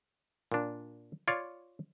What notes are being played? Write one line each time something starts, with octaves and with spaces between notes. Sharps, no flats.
A#2 D4
F4 C#5 D5